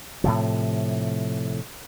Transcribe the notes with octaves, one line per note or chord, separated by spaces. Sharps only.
A2 C3 F3